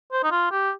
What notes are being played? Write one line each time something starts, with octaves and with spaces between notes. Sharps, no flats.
C5
D#4
F4
G4